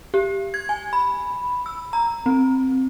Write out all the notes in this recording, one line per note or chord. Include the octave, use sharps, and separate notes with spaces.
G4
G#6
G#5
B5
E6
A#5
C4